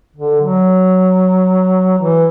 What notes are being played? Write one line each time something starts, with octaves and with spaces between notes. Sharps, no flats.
D3
F#3
E3